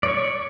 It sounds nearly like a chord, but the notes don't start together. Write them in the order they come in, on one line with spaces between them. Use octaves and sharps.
D5 C#5 C#6